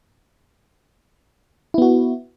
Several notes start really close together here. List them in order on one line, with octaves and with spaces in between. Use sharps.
E4 B3 F#4